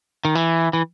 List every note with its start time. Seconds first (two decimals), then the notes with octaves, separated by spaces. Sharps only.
0.25 D#3
0.35 E3
0.73 E3